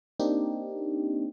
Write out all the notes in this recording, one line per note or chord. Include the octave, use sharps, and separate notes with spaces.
A#3 C4 D4 D#4 G4